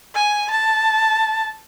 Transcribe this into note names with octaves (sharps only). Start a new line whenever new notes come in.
G#5
A5